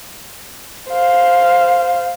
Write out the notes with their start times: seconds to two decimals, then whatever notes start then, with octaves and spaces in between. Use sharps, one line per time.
0.90 C5 F5